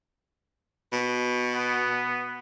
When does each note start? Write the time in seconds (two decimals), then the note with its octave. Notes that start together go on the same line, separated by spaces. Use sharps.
0.93 B2
1.54 B3